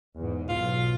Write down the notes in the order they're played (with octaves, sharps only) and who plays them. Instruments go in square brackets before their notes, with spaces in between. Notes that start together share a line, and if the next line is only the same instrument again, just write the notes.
[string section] E2 G#2
[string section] B1 [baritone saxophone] F4